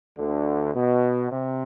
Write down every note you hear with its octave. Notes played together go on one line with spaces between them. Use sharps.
D2 D3
B2
C3